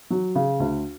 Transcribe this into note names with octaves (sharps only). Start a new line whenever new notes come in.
F#3
C#3
D2